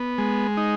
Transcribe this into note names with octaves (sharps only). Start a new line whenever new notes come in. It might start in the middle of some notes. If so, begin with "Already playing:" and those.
Already playing: B3
G#3
D#4